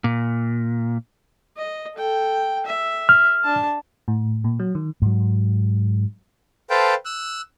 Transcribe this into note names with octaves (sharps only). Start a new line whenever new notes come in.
A#2
D#5
A4 G5
E5
F6
D4 A5
A2
A#2
F#3
D#3
G#2 F#3
A4 B4 C5 F5 G5 A5
E6 F#6